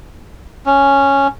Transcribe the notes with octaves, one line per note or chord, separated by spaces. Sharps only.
C#4